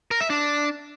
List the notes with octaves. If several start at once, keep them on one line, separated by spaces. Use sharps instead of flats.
A#4
E5
D4